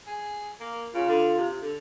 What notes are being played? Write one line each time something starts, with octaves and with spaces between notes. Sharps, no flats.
G#4
A#3
C#3 F4
D3
C3
D3